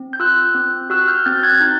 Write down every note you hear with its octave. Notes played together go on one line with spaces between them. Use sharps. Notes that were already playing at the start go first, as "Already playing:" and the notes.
Already playing: C4
G6
F4 E6 F#6
C4
F#4 E6 F#6
F6 G6
C4 G6 A6
F#6 G#6
D#4 G6 A6